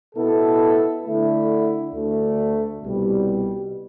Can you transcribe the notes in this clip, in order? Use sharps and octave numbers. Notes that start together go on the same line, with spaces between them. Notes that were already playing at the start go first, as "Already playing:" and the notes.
B2 B3 E4 A4
D3 A3 E4
D2 D3 A3
C2 B2 G3